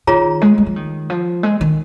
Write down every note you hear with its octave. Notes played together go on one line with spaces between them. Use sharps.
D#3 F4 G#4 C#5 A#5
G#3
G#3
F3
D#3
F3
G#3
D#3